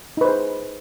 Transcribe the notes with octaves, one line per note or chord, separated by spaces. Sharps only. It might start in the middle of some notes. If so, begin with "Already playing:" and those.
D#4 G#4 B4 C5